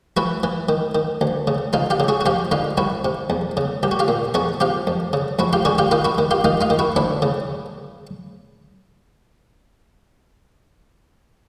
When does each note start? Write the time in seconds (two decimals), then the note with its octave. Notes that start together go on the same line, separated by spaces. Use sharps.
0.17 E3 E4 F#4
0.43 E3
0.69 D#3
0.95 D#3
1.21 D2
1.47 C#3
1.73 C#2 D#4 F4
1.90 F4 G4
2.00 C#3
2.08 F#4 G#4
2.21 F#4
2.26 F2 F4 G4
2.51 D3 D#4 F4
2.77 C2 E4 F#4
3.05 C3
3.30 E2
3.57 C#3
3.83 C2 G4
3.91 F#4
3.99 F4 G4
4.08 A#2
4.34 E2 F#4 G#4
4.60 C3 F4 G4
4.87 F2
5.13 C#3
5.39 F2 E4 F#4
5.53 F4 G4
5.65 D3 F#4 G#4
5.78 F4 G4
5.91 D#3 D#4 F4
6.05 E4 F#4
6.18 D#3
6.31 F4 G4
6.44 D#3 D#4 F4
6.61 D#4 F4
6.70 D#3
6.79 E4 F#4
6.96 D2 D4 E4
7.22 C#3